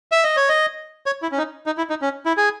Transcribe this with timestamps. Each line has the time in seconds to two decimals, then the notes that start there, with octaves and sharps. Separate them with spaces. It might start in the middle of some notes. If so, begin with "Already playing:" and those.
0.12 E5
0.24 D#5
0.37 C#5
0.49 D#5
1.06 C#5
1.22 E4
1.32 C#4
1.38 D#4
1.66 D#4
1.78 E4
1.90 D#4
2.02 C#4
2.26 E4
2.37 G#4